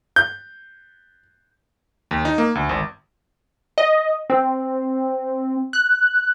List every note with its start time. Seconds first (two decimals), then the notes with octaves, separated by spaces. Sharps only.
0.16 G6
2.11 D#2
2.25 D#4
2.38 A#3
2.55 D2
2.69 G#1
3.78 D#5
4.30 C4
5.73 F#6